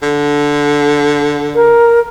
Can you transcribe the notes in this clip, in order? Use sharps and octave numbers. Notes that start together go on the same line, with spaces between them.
D3
A#4